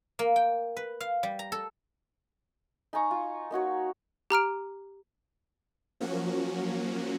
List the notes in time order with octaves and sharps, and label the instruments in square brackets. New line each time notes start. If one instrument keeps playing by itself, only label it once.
[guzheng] A#3
G5
B4
F5
G3
A#5
A4
[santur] D#4 G#5 A#5 C#6
F4
A#3 D#4 F#4 C#5
[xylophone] G4 A#5 F6 D7
[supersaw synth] F3 F#3 A#3 C#4 F#4